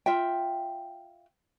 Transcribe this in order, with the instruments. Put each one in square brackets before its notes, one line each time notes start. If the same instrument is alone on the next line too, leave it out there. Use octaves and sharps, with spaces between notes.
[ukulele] F4 E5 G5